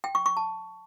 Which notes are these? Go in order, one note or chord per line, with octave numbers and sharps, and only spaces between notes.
G5
C#6
C#6
A5